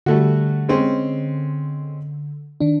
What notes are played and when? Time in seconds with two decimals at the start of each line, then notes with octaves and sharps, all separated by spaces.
0.06 D3 G3 A3 F#4
0.69 G#3 C4 C#4
2.60 D#3 D4